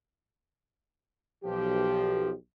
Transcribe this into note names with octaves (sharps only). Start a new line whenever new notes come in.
B1 F3 G4